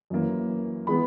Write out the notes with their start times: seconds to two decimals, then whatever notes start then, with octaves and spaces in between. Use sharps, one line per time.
0.10 F#2 E3 A#3
0.87 E3 G#3 B3 B5